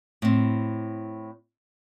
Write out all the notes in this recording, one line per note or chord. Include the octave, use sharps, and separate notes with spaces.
A2 C4